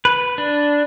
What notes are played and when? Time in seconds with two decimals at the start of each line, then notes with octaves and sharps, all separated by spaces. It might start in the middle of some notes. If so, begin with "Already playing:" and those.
0.05 B4
0.38 D4